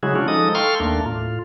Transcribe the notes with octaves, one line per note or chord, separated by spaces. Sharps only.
C#3 F#3 G#3 E4 F#4 G#4
C#4 D4 F4 F#4
F3 G#3 D#4 A4 D#5 D#6
A4 F5 G5 C6 C#6 F6
D#2 A3 A#3 D4
A2 F4